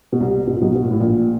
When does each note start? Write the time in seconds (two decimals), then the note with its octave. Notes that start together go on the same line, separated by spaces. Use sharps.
0.12 B2
0.20 C2 C3
0.47 B2
0.54 A#2
0.61 B1 B2
0.75 B2
0.83 A#2
0.91 A2
1.00 A#1 A#2